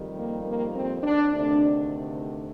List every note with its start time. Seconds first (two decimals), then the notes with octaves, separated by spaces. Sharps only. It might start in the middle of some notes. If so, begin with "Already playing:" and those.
Already playing: F2 D#3 G3
0.19 A#3
0.47 A#3
0.75 C4
1.03 D4
1.31 D2 C3 D#3 A3 D4